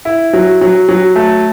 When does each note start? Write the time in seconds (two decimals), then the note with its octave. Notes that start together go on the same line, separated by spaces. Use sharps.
0.05 E4
0.33 F#3
0.61 F#3
0.89 F#3
1.16 A3